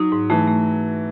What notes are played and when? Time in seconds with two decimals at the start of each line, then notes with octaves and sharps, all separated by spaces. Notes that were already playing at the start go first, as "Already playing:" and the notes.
Already playing: F#3 D#4
0.12 G#2
0.30 E3 A3
0.48 A3